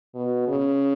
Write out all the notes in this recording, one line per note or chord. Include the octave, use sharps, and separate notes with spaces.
B2
C#3